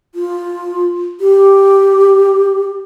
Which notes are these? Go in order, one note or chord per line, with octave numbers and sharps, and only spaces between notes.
F4
G4